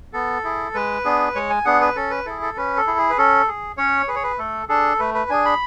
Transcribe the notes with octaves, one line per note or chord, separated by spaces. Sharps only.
B3 A4
E4 G#4
G#3 B4
B3 D4 G#4
G#3 C#5
G#5
B3 D4 G#4 F#5
B4
C#4 A4
B4
E4 G#4 A4
A4
C#4 B4
A4
E4 G#4
G#4
B4
C#4 A4
G#4
C#4 C#5
G#4 B4
C#5
B4
A3 A4
D4 G#4 A4
A3 B4
B4
D4 G#4 G#5
B5